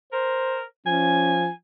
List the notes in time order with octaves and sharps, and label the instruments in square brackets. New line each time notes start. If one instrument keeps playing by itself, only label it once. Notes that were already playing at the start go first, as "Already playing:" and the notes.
[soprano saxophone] A#4 [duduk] C5
[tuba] F3 [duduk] C#4 [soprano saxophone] G#5